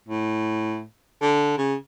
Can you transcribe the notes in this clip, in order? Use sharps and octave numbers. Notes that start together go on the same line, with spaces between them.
A2
D3
C#3